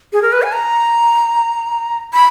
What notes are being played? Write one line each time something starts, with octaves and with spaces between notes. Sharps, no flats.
G#4
A#4
B4
G#5
A#5
B5